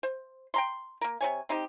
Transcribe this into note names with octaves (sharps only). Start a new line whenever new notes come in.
C5
G5 A#5 C6
A#3 A#4
C3 C#5 G#5
C4 D#4 G4